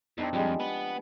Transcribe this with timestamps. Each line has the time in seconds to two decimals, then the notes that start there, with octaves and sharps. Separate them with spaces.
0.18 E2 C4 D4 D#4
0.33 F2 F3 G3 G#3
0.60 B3